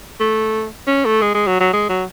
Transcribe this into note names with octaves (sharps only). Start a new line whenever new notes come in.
A3
C#4
A3
G#3
G#3
F#3
F#3
G#3
F#3